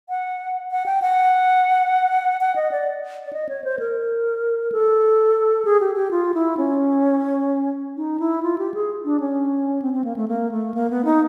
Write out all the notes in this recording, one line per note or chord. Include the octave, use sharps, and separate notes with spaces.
F#5
F#5
G5
F#5
F#5
D#5
D5
D5
D#5
C#5
C5
A#4
A4
G#4
G4
G4
F4
E4
C#4
D#4
E4
F4
G4
G#4
D4
C#4
C4
C4
A#3
A3
A#3
A3
A#3
B3
D#4